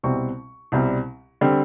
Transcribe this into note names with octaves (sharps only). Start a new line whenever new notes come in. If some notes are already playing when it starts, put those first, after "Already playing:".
C2 B2 G3 C4 C#6
C2 B2 G3 C4
D3 G3 C4